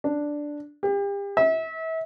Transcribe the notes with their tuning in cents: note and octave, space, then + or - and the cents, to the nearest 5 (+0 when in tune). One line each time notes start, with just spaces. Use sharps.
D4 +0
G4 +35
E5 -35